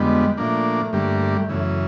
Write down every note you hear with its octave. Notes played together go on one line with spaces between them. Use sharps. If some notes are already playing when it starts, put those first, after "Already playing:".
Already playing: F2 D3 G3 G#3 B3
A#2 F3 A3 A#3 D4
G2 D3 G3 A#3
F#2 C#3 E3